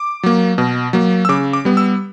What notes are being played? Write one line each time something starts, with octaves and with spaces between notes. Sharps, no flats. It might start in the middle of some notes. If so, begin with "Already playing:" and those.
Already playing: D6
F#3 A#3
B2
F#3 A#3
E6
C#3 D6
D6
G3 B3
E6